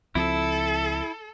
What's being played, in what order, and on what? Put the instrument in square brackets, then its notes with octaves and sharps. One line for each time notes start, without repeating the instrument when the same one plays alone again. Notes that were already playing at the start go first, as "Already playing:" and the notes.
[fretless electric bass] C#2 F3 C4 [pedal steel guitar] E4 [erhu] A4